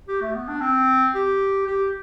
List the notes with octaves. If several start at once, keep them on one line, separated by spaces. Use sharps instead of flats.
G4
A3
B3
D4
C4
G4
G4